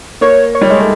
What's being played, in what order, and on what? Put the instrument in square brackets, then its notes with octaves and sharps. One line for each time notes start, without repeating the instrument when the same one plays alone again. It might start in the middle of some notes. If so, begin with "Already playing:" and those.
[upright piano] A#3 [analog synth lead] C#5
[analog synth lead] C#5
[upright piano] G3
G#3
A3